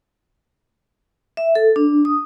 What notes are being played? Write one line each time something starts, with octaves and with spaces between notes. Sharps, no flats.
E5
A4
D4
D#6